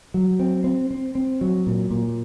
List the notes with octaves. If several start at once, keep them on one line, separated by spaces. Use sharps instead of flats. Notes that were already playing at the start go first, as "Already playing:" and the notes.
F#3
C4
C4
C4
C4
F#3
A#2
A#2